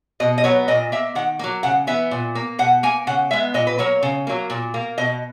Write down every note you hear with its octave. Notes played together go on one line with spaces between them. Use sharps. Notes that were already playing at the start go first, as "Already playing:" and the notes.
B2 D#5
D#5
F#3 B3 C#5
A#2 D#5
A#3 E5
D#3 F#5
F#3 A#3
C#3 F#5
E3 B3 E5
A#2
A#3
B2 F#5
A#3 G#5
C#3 F#5
G#3 B3 E5
A#2 D#5
B4
F#3 A#3 C#5
C#3
F#3 A#3
A#2
A#3
B2 D#5